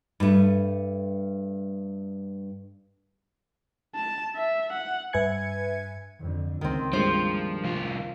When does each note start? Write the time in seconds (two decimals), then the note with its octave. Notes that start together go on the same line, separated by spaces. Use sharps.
0.20 G2 A3
3.95 A5
4.36 E5
4.73 F#5
5.13 G2 B4 E5 G#5 G#6 C#7
6.19 F2 D3
6.61 C#2 D#3 C4
6.93 G2 F3 G#3 A#3 C5
7.64 C2 F4